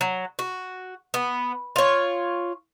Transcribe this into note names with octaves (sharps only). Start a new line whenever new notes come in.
F#3
F#4
B3
F4 C#5